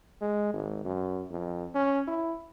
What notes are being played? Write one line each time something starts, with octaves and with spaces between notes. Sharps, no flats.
G#3
G#1
F#2
F2
C#4
E4